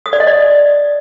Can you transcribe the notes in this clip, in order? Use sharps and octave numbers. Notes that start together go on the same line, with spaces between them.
D#6
D5
D#5
D5